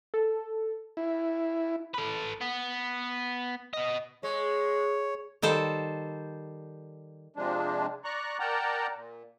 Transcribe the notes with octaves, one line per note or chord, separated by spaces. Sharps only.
A4
E4
A4 B4
B3
B3 D#5
G#3 C#5
D#3 G3 A4 C5
C3 F3 G#3 D4
D5 A#5 C#6 F#6
A#4 D5 F#5 G5 A5 A#5
A#2